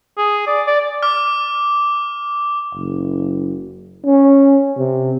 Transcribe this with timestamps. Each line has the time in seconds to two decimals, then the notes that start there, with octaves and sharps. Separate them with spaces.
0.18 G#4
0.47 D5
0.67 D5
1.03 D6 F6
2.75 F#1
4.05 C#4
4.77 C3